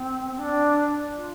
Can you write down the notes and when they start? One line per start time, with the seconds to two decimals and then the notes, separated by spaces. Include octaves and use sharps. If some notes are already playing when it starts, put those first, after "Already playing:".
Already playing: C4
0.32 C4
0.39 D4
1.17 F4